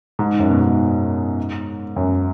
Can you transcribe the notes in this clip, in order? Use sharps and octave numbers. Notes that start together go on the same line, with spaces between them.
G#2
F#2
B2
G#2
F#2